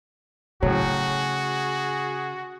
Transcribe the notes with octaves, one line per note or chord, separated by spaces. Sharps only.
A2 C#3 F#3 F#4 G#4